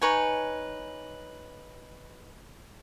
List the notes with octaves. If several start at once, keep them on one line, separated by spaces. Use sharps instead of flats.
D#4 B4 C#5 G#5